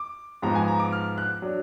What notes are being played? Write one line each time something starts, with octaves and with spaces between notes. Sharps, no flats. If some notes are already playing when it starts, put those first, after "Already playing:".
Already playing: D6
G#2 F3 B3 A#5
G#5
A#5
D6
F6
F#6
F#3 D4